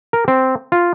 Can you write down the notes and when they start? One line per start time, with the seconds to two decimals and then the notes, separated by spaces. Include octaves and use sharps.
0.13 A#4
0.28 C4
0.72 F4